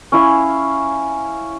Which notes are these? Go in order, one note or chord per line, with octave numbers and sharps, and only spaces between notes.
C#4 E4 F5